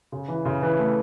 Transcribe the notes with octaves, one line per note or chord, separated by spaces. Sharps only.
C#3
E3
C#3
E3
A3